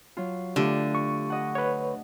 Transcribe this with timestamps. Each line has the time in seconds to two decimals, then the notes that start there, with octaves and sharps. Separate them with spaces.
0.17 F#3 F4
0.56 D3 A3 F4 G4
0.95 C#6
1.30 D#5 F#5
1.55 B4 C#5